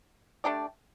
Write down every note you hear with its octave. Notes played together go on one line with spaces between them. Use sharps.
A3 D4 G4 D5